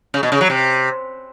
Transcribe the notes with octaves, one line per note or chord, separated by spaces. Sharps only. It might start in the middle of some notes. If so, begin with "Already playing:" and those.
C#3
B2
C#3
F#3
C3